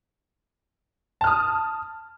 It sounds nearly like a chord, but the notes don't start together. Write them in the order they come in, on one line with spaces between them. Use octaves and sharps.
A5 F6 D#6